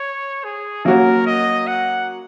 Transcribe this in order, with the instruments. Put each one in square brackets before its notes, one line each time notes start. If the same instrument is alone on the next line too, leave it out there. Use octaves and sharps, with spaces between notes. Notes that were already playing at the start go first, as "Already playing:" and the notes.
Already playing: [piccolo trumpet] C#5
G#4
[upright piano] F#3 A#3 C#4 F#4 C#5 [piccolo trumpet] A#4
[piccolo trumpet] D#5
F#5